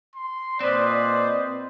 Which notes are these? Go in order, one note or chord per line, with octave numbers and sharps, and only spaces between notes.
C6
A#2 C4 B4 C5 D5 D#5